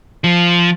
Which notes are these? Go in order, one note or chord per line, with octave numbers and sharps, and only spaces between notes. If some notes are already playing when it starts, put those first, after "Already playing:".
F3